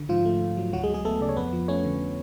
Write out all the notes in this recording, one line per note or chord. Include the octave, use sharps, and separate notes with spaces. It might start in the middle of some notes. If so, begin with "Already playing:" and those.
Already playing: D3
G#2 F3 F4
A3
G#2
F#3
D2 F#3 F#4
G#3 G#4
F#3
G#3 G#4
A3 B3 A4
C#3 D5
C#5
F2 B3 B4
F3
A3 C#4 C#5
D3